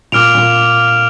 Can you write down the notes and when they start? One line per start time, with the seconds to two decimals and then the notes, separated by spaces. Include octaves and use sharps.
0.12 A#2 D6 F6 D7 F7
0.35 A#2